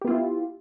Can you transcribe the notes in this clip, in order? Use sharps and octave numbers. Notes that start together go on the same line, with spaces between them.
B3 E4 F4 G4